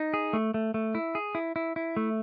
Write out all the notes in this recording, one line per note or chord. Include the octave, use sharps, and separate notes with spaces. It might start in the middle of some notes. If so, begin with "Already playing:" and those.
Already playing: D#4
G#4
A3
A3
A3
E4
G#4
E4
E4
E4
A3